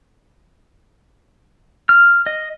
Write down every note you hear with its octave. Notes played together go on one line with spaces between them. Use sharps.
F6
D#5